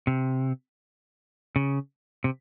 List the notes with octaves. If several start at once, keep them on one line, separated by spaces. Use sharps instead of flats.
C3
C#3
C3